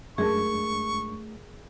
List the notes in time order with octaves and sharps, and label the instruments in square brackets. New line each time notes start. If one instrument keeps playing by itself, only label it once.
[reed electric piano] F#2 G#3 D4 [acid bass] A3 [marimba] G#4 A#4 A5 [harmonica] C#6